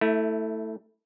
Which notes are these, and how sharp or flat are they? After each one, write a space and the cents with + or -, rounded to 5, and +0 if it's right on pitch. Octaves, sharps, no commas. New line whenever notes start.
A3 +10 E4 -20